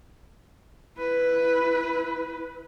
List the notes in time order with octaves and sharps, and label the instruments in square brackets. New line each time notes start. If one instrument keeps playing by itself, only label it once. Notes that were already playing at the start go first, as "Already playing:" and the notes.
[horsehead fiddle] E4 B4